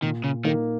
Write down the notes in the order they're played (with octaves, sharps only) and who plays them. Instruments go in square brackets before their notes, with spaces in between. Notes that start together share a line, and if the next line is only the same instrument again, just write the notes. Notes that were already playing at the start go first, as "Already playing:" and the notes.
[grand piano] A#2 [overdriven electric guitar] D#3
[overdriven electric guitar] C#3
[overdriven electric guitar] D#3 [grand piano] A#3 D#4